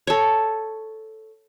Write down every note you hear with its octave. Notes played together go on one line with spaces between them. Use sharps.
A4 C#5